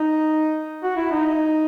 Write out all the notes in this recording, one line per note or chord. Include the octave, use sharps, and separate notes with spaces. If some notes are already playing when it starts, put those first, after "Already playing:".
Already playing: D#4
F#4
E4
D#4